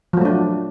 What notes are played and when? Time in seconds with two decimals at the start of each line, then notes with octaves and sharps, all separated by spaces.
0.13 F3
0.17 F#3
0.21 A3
0.25 D4